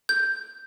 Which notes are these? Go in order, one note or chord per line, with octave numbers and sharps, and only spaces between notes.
G6